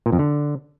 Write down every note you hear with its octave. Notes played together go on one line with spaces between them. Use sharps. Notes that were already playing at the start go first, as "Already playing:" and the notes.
A#2
F2
D3